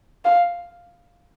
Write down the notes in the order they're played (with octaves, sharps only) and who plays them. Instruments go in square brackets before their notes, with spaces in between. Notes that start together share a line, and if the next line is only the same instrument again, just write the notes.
[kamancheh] F5